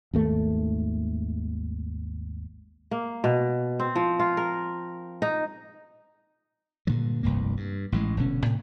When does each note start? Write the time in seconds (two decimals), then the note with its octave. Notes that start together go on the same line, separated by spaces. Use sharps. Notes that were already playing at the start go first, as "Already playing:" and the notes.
0.14 G#1 D#2 A3
2.91 A#3
3.24 B2
3.80 C4
3.96 F3
4.19 F4
4.37 A#4
5.22 D#4
6.87 G2 A#2 D3 F#3
7.23 F1 C2 G2 A#3
7.57 G2
7.92 A1 A2 F#3 G#3
8.17 F1 B2 D3 C#4
8.46 A2 C3